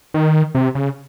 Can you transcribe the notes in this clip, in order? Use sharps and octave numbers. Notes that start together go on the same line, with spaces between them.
D#3
C3
C#3